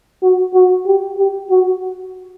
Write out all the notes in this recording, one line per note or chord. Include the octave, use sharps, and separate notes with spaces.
F#4
F#4
G4
G4
F#4